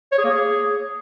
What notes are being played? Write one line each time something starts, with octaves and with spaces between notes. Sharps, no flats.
C#5
G#4
A#3
G#4